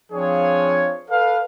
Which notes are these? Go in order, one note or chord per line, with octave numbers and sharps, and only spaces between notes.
F3 C4 D4 F4 G#4 C#5
A4 B4 D5 F5